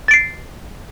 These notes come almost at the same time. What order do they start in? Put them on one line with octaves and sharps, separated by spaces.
A6 D7 C7